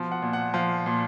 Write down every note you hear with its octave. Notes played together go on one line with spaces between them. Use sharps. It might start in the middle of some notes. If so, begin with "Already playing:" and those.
Already playing: B2 F3
F#5
A#2
F#5
F3 F5
A#2